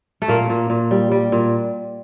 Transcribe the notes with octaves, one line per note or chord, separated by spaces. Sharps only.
A3
A#2 A#3
A#2
A#2
G3
G3
A#2